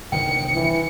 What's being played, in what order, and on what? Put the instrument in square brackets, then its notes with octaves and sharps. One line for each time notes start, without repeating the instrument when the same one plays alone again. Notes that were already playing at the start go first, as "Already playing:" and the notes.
[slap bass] G1 C2 D#3 [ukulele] G5 [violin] C#7
[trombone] E3